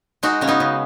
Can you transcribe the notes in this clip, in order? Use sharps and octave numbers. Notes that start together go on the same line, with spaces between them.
G#3 D#4 F#4
C#3 C#4
B3 D#4
C#3